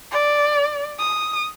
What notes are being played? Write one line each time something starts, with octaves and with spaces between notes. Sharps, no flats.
D5
D#6